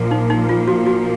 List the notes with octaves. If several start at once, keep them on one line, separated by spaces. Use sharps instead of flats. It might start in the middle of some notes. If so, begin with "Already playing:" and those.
Already playing: A#1 A#2 F3 A#3
D#4
D#4
F4
F#4
F#4